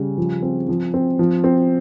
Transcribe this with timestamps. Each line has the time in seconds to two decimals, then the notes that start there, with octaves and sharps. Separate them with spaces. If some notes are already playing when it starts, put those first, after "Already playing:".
Already playing: C#3 G3
0.18 F3
0.42 C4
0.69 F3
0.94 C4
1.19 F3
1.44 C4